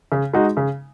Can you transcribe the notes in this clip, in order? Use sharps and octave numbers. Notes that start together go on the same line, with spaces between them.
C#3
G#3 D#4 F#4
C#3